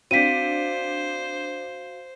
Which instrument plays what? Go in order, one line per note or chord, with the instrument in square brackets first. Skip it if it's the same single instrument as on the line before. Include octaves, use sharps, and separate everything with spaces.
[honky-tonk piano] C4 D4 [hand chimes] F#4 F5 D7 [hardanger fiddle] C5 [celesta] B6 D#7